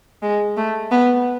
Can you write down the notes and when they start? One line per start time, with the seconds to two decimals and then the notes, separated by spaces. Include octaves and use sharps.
0.22 G#3
0.57 A3
0.91 B3